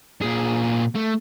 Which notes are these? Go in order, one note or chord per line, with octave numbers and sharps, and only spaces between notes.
A#2 G#4
A3